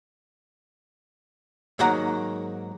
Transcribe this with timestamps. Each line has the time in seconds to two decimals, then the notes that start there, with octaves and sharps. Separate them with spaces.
1.79 G#2 D#3 F#3 A#3 F#5 A#5